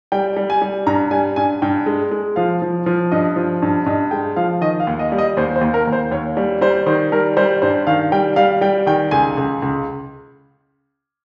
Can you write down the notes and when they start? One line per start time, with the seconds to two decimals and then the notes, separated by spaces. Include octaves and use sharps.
0.12 G3 G5
0.36 G3
0.50 G#5
0.62 G3
0.86 G2 A#5
1.11 G3 G#5
1.36 G2 G#5
1.62 G2 G5
1.86 G#3
2.11 G#3
2.36 F3 F5
2.62 F3
2.86 F3
3.12 G2 D#5
3.36 F3
3.62 G2
3.86 G2 D#5
4.11 G#3 G5
4.36 F3 F5
4.61 D#3 D#5
4.80 F5
4.87 D#2
4.99 D#5
5.12 G3
5.18 D#5
5.37 D#2 C5
5.56 C5
5.61 D#2
5.74 A#4
5.87 D#2
5.92 C5
6.11 D#2 C#5
6.37 G3
6.61 G3 C5
6.86 D#3 C5
7.12 G3 A#4
7.37 G3 C5
7.62 G2 C5
7.87 D#3 F5
8.12 G3 G5
8.36 G3 F5
8.61 G3 G5
8.87 D#3 G5
9.11 C#2 G#5
9.37 C#2
9.62 C#2